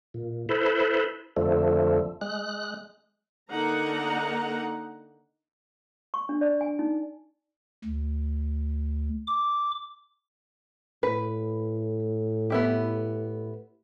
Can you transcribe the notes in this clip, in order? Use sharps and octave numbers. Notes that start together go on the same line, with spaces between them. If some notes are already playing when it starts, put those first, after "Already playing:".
A#2
E4 A4 B4 C5
F2 D3 F3 A3
G#3 F#6
D3 A#3 D#4 F#5 A#5
C#6
D4
D5
G#5
D#4
D2
D6
A2 B4
B3 E4 G4